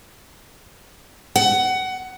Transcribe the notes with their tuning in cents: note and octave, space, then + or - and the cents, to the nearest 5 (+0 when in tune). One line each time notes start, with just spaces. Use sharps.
F#5 +20